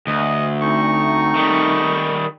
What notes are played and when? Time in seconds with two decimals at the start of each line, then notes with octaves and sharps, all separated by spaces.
0.07 D2 D#5
0.62 A3 C4 D#4 C#6
1.36 D#3 G3